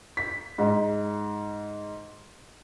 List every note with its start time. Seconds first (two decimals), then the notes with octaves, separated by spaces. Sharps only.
0.17 B6
0.58 G#2